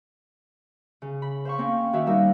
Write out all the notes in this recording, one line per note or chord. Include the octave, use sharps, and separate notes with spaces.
C#3
B5
C5 F5 C#6
A#3 C4 C#4
D#3 F#4 C#5 E5 F5
G3 D#4 A#4 E5